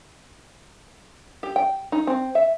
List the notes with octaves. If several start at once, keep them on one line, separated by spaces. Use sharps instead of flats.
G4
G5
D#4
C4
E5